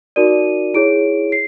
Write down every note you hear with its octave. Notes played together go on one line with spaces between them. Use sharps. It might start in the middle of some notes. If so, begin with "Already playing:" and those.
D#4 F#4 A#4 D5 D#7
E4 G#4 C#5 D7
C7